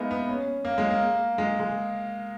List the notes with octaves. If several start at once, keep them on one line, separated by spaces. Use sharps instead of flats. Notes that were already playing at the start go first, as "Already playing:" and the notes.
Already playing: G#3 A#3 B3 D#4 E4
B3
C#4
A#3
G#3
A#3
G#3
G#3